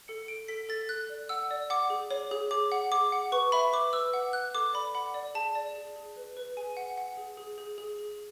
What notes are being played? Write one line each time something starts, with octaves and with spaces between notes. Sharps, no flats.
A4 C#7
A4 D7
A4 B6
A4 A6
A4 F#6
D5
F#5 E6
D5
F#5 D6
G#4
C#5
G#4
G#4 D6
F#5
G#4 D6
F#5
B4 C#6
E5 B5
B4 D6
B4 E6
F#5
F#5 F#6
A4 D6
D5 B5
F#5 B5
D5
G#4 A5
D5
G#4
G#4
B4
B4
G#4 G#5
F#5
F#5
G#4
G#4
G#4
G#4
G#4